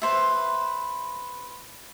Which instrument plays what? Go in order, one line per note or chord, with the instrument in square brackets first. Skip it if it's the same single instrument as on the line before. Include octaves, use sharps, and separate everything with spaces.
[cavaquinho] B4 C5 E5